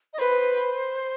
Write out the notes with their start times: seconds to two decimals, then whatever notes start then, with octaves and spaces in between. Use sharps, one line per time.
0.13 D#5
0.19 B4 C5